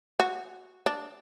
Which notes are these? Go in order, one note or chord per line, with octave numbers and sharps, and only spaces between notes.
F#4
D4